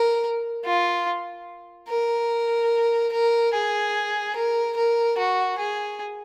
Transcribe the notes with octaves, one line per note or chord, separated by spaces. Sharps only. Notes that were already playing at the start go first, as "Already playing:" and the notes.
Already playing: A#4
F4
A#4
A#4
G#4
A#4
A#4
F#4
G#4